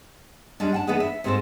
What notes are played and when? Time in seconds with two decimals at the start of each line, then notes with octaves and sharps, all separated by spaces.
0.60 G3 G#3 C#4 D4
0.72 F#5 G5 A5
0.87 E3 B3 D4 D#4 G#4 B4
1.00 E5
1.24 G#2 G#3 C4 G4 A4 C5